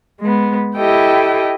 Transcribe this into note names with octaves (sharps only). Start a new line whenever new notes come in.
G#3 B3
E4 G4 A4 D#5 G5